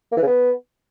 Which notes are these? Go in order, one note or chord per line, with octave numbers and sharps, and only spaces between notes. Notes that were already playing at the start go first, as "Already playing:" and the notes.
A#3
E3
C#3
B3